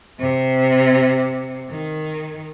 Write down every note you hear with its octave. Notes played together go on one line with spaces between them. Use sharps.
C3
D#3